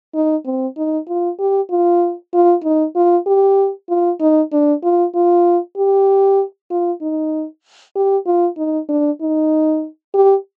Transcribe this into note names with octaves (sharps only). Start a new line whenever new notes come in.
D#4
C4
D#4
F4
G4
F4
F4
D#4
F4
G4
F4
D#4
D4
F4
F4
G4
F4
D#4
G4
F4
D#4
D4
D#4
G4